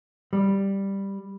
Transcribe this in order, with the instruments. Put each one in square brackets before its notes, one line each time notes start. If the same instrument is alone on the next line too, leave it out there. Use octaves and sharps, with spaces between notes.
[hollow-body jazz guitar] G3